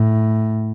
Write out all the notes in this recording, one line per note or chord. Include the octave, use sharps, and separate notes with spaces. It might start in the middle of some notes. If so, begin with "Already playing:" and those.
Already playing: A2